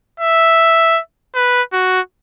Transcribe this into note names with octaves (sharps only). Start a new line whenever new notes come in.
E5
B4
F#4